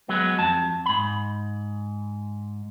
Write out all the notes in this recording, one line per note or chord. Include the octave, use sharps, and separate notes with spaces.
F#3 G#3 B3
F2 A5
G#2 B5